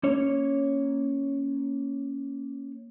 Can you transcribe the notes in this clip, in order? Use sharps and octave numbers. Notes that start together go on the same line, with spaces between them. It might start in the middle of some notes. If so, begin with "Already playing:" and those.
A#3 C#4 C#5